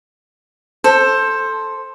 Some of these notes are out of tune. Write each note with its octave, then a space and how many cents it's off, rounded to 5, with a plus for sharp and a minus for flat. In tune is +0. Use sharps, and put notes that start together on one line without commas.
A4 +0 C5 +10